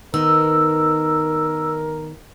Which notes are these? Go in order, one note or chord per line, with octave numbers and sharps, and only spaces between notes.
D#3 B3 D#4 A#4 E6